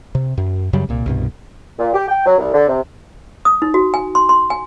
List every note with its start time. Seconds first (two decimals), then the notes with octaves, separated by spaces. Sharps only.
0.15 C3
0.38 F#2
0.73 F#2 C#3 F#3 G3
0.89 C2 A#2
1.06 C2 G2 B2
1.78 A#2
1.94 G4
2.08 G5
2.26 F#3
2.38 C2
2.54 D3
2.68 C3
3.45 D#6
3.62 D#4
3.74 F#4
3.94 G#5
4.15 C6
4.29 C6
4.50 G#5